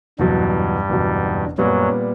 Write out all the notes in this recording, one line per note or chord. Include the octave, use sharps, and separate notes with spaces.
F#1 E2 G2 B2 F#3 G3
F#1 E2 B2 F#3
F#2 A#2 F#3 G3 B3